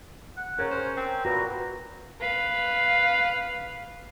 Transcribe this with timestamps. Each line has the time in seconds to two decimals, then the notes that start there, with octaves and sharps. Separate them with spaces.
0.37 F#5
0.59 C#3 C#4 A#4 C#5
0.71 C5
0.97 C4
1.25 A#2 F#4 B4 A#5
2.20 B4 F5